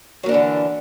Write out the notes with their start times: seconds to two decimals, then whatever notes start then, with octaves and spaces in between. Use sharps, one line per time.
0.23 F#3
0.26 A#3
0.29 D4
0.31 E3
0.34 D3